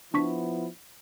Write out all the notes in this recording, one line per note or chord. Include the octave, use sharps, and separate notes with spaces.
F3 B3 D4 E4 C#6 B6